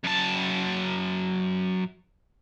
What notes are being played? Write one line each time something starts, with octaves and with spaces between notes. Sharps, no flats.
F#2 A5